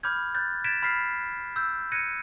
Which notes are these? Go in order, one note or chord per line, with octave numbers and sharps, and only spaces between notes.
B5 D6 F6 G6 G#6
F#6 G6 A6
G#6 A6 B6 D7 E7
B5 F6 B6 C7
E6 G6
F#6 G#6 A#6 C#7 D#7